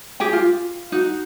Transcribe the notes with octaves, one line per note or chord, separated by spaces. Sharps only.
G4 G#4 G5
F4
D#4 F#4